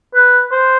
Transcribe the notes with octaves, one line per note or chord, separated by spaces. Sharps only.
B4
C5